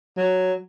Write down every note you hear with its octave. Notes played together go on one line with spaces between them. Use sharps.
F#3